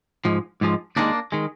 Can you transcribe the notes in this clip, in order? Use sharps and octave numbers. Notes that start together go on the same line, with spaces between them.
G#2 F3 G#3
G#2 F3 G#3
D#2 D#3 G#3 A#3 D4
D#3 G#3